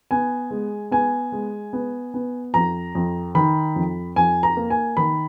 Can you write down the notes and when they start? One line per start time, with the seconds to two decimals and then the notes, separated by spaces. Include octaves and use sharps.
0.11 B3 G#5
0.51 G#3
0.91 B3 G#5
1.32 G#3
1.73 B3
2.14 B3
2.54 F2 A#5
2.95 F2
3.35 D#3 B5
3.76 F2
4.16 F2 G#5
4.43 A#5
4.57 A#3
4.70 G#5
4.97 D#3 B5